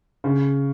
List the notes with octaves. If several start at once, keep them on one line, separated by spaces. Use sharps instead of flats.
C#3